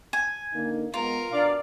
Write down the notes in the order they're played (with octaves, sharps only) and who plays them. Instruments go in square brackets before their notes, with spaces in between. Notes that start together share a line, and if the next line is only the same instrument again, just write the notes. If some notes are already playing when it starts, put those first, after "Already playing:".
[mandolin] G#5
[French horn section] D3 A#3 D#4
[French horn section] G#3 B3 [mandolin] F4 [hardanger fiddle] A#4
[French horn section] B2 D4 [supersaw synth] D5 F5